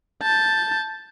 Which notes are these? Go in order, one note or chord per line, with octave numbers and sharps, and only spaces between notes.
A5 G6